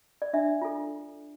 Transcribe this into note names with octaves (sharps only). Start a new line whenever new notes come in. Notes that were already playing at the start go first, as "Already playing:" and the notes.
D5
D4 E5
F4 A4